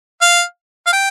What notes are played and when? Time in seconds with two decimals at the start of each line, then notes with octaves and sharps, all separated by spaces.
0.22 F5
0.87 F5
0.93 G5